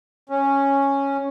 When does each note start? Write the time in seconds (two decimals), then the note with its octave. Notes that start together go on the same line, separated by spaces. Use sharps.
0.29 C#4